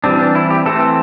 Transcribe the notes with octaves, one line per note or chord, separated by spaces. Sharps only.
E3 G3 C4 D4
D4
E4
G4
E3 A3 C4 A4